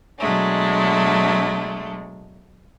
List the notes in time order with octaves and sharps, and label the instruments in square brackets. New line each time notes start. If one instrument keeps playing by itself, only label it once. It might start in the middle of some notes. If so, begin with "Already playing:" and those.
[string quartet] B2 F#3 G#3 A3 D4